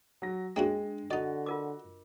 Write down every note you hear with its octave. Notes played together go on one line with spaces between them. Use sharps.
F#3 A#6
G#3 A#3 C#4 D4 F#4
D3 D#4 F#4 D5 D#5
F4 A#4 D6